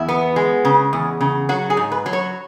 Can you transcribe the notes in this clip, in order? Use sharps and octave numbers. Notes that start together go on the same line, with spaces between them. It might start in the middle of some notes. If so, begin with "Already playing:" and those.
Already playing: E2 E4
B3
G#3
C#3
E2
C#3
F#3 F#4
G#4
G#2
B4
F#3
C#5